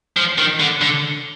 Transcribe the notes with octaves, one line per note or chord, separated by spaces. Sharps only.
F3
D#3
D3
D3